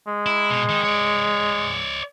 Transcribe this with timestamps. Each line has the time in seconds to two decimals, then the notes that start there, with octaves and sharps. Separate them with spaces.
0.07 G#3
0.26 E4
0.50 B2
0.69 D#3 D#4
0.84 C#5 D5